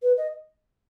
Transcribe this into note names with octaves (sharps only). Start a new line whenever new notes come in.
B4
D#5